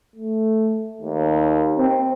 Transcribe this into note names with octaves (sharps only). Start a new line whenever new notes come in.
A3
D#2
C4